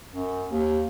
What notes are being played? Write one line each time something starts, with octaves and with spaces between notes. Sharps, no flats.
F#2
D#2